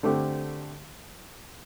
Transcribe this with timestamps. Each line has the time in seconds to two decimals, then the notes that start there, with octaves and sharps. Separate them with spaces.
0.03 D3 A3 C4 G4